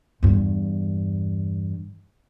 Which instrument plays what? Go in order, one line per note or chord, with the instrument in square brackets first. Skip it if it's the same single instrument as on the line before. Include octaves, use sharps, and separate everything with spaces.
[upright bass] E2 G2